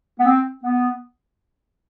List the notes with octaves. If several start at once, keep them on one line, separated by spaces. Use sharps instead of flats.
B3
C4
B3